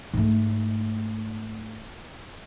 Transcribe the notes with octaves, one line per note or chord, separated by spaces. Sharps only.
G#2 A3